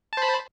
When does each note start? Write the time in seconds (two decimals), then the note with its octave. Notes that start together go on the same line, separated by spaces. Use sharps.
0.13 A5
0.17 C5
0.22 B5